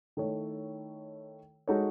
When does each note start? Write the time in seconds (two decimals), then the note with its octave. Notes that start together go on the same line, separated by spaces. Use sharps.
0.17 D#3 A3 E4 A4 C#5
1.68 G#3 D#4 F#4 A4 C#5